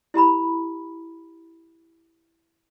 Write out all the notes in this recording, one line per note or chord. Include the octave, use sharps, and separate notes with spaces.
E4 G4 A#5 B5